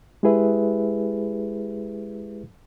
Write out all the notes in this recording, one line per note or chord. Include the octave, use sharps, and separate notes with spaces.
G#3 E4 G4 G#4 B4 E5